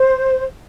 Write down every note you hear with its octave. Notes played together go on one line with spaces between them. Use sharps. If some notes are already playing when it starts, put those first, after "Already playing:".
Already playing: C5